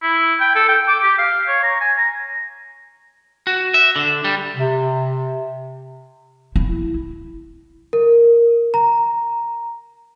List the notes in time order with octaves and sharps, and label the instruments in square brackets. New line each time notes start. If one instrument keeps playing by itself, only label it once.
[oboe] E4
G5
A4
G5
D6
G4
F5
C#5
A#5
G#5
A#5
[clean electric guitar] F#4
E5
D3
G3
[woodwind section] C3
[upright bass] E4
[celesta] A#4
A#5